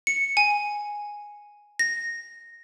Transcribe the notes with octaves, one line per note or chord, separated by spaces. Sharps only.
C#7
G#5
A#6